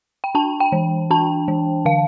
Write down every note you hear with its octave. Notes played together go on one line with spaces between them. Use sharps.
G5
D4 A5
G5
E3
D4 A5
E3
D3 F5